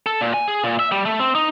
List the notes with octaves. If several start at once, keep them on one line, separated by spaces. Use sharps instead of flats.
A4
A#2
G#5
G#4
A#2
E5
G3
A3
C4
D#4